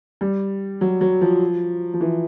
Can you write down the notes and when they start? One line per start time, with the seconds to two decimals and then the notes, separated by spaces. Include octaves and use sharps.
0.21 G3
0.81 F#3
1.01 F#3
1.21 F3
1.94 F3
2.01 E3